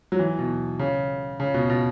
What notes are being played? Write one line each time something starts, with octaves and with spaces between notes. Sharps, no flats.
F#3
E3
B2
C#3
C#3
B2
B2